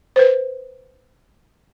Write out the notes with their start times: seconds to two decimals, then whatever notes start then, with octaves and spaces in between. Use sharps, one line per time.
0.16 B4 C5